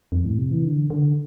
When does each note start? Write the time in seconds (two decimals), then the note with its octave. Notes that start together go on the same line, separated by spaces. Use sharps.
0.12 F2
0.25 A2
0.38 C3
0.51 E3
0.65 D3
0.90 D3